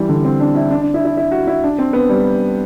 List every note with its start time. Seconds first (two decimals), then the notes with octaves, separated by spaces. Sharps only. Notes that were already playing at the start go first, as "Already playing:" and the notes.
Already playing: E3 G3
0.09 D3
0.25 C4
0.40 D4
0.55 E4
0.71 D4
0.82 D4
0.94 E4
1.05 E4
1.17 E4
1.32 F#4
1.47 E4
1.63 D4
1.79 C4
1.93 B3
2.09 G3